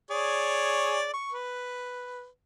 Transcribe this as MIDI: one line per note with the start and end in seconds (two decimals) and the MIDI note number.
0.11 1.09 68
0.11 1.09 73
0.11 1.09 74
1.14 1.33 85
1.33 2.26 71